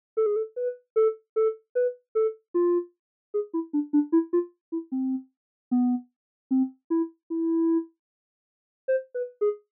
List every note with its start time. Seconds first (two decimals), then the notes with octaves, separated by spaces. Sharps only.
0.17 A4
0.26 G#4
0.36 A4
0.56 B4
0.96 A4
1.36 A4
1.75 B4
2.15 A4
2.54 F4
3.34 G#4
3.54 E4
3.73 D4
3.93 D4
4.12 E4
4.33 F4
4.72 E4
4.92 C4
5.71 B3
6.51 C4
6.90 E4
7.30 E4
8.88 C5
9.14 B4
9.41 G#4